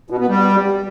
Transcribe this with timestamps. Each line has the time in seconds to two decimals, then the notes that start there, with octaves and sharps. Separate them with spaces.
0.10 B2
0.19 B3
0.28 G3